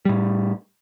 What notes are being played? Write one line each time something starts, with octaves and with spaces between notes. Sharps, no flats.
A2 G3